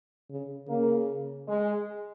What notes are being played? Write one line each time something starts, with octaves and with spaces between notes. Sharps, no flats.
C#3
C#3 A#3
G#3